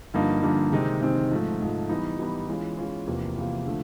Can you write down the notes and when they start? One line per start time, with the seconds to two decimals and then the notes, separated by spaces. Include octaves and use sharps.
0.14 G2 D3 F3 A#3 D#4
0.42 G2 D3 F3 A#3 D#4
0.72 C3 D#3 G#3 C4 D#4
1.02 C3 D#3 G#3 C4 D#4
1.31 G#2 F3 A3
1.61 G#2 F3 A3
1.89 E3 G3 B3 D#4
2.19 E3 G3 B3 D#4
2.48 E3 G#3 C#4 F4
2.77 E3 G#3 C#4 F4
3.07 E2 C3 F3 A#3
3.36 E2 C3 F3 A#3
3.66 D3 F3 A3